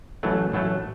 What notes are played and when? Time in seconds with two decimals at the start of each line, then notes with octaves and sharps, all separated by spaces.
0.23 A1 A2 F#3 A3
0.52 A1 A2 F#3 A3